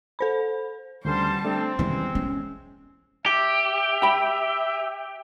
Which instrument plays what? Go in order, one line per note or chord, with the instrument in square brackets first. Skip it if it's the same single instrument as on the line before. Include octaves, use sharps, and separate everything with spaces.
[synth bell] A4 C5 B5
[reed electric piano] D2 D3 [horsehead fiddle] G3 A5 [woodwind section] B3 C#4 C5
[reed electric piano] A3 D4 [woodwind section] C4
[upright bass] D#3 C#4 [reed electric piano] E3 G3 B3 [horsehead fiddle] G#3
[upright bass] C#4
[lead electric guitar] G4 [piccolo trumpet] E5
[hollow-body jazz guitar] G5 B5